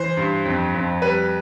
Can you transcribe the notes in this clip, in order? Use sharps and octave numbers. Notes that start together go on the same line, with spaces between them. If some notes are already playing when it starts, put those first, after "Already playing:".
Already playing: E3 C5
G2
F2
F2
G3 B4